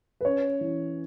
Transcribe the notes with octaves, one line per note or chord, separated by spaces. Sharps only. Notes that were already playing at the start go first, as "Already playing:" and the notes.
B4
C#4 C#5
E3